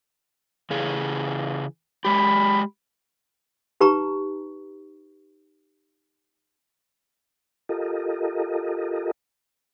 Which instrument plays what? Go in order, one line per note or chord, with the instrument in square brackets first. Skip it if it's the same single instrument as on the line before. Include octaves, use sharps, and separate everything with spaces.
[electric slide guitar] C#3 E3 G#4
[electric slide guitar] G#3 G4 [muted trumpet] B5
[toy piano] D#4 G4 B4 A#5 C#6
[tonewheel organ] F4 G4 A4 A#4 D#5